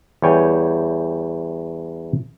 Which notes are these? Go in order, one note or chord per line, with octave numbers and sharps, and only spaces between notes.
E2 G3 C#5 G5 G#5